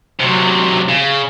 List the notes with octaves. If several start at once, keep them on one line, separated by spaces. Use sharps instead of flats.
C3 F#3
C#3